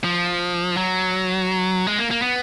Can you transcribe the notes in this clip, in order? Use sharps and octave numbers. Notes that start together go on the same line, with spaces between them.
F3
F#3
G#3
A#3
A#3
B3